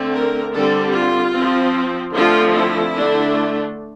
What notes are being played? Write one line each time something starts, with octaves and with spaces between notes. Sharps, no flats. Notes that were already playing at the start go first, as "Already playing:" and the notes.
Already playing: D3 A3 C4
A#4
D3 G3 C4 A4
F4
F3 C4
D3 F3 A3 C4 F4
E4
D3 A3 D4